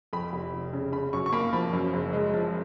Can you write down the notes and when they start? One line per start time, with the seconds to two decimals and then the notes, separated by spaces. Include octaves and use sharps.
0.13 F2 B5
0.33 F1
0.53 F1
0.73 C#3
0.92 C#3 B5
1.13 F#2 C#6
1.26 C#6
1.33 A#3 B5
1.53 F3 B5
1.73 F#2
1.93 F#1
2.13 G#3
2.34 F3